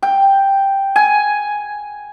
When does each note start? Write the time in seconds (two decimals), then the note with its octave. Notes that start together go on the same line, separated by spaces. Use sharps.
0.03 G5
0.96 G#5